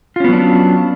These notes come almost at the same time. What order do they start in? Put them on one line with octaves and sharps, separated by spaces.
F4 C#4 B3 F#3 D4